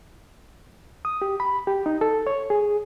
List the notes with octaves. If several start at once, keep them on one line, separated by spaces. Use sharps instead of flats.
D#6
G4
B5
G4
D#4
A4
C#5
G#4